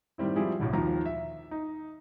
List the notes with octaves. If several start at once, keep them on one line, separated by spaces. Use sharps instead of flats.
A2 D#3 G3 C4 E4
F3 G3 C4 E4 G#4
B1 A2 D3
D#2 D#3 F3 A#5
E5
D#4